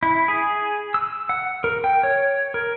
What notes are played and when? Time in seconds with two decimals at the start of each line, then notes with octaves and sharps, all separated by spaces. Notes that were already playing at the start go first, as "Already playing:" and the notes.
0.03 E4
0.28 G#4
0.94 E6
1.29 F#5
1.64 A#4
1.84 G5
2.03 C#5
2.54 A#4